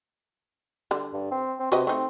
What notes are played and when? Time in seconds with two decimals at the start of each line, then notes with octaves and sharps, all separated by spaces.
0.91 D3 G3
1.13 G2
1.31 C4
1.60 C4
1.72 C3 F#4 B4 D#5
1.87 A3 C4 D#4